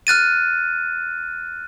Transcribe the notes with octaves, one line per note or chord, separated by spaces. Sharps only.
F6 F#6 A6 D#7